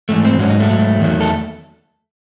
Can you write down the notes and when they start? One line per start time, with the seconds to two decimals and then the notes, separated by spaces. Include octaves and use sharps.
0.09 G#2 E3 A3
0.25 C4
0.39 G#2 F#3 C#4
0.49 D#4
0.60 A3
0.70 G#2 F#3
1.00 E2 D#3 F#3
1.21 A4